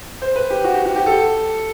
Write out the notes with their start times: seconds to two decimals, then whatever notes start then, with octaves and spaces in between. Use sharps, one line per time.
0.22 C5
0.36 B4
0.50 G4
0.64 F#4
0.75 G4
0.85 F#4
0.96 G4
1.06 A4